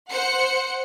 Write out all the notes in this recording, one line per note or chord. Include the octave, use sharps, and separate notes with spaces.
C5 F#5 C#7